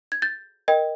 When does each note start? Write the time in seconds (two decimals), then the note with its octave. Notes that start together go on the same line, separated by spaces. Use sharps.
0.12 G#6
0.22 G6 A6
0.68 A#4 D#5 G5